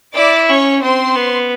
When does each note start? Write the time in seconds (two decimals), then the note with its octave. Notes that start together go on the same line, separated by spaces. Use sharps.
0.15 E4 D5 D6
0.49 C#4 C#5 C#6
0.82 C4 C5 C6
1.15 B3